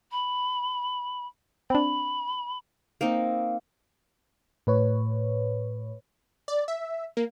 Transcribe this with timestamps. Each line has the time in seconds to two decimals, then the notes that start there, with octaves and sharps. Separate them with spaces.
0.11 B5
1.70 C4 D4 B5
3.01 A#3 C4 D#4
4.67 A2 B4 C#5
6.48 D5
6.68 E5
7.17 A#3